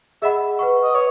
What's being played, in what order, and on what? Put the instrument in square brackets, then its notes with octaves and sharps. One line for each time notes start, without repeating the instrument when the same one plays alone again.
[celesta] G#4 D#5 F#5 B5 [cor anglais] E5
[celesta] B4 F#5 C#6
[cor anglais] D#5
[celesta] B4 [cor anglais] C#5